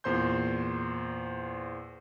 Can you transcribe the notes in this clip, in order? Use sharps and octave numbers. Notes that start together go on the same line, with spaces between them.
E2 A#2 C5 C6 G6